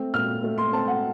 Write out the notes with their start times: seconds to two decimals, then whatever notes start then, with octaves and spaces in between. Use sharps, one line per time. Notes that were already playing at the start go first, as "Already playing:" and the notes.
Already playing: A3 C4
0.14 A#2 F6
0.44 A3
0.58 C6
0.73 C4 A5
0.88 F#5